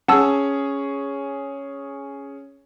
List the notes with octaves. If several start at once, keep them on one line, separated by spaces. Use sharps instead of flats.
C#4 G#4 F#5 A5 E6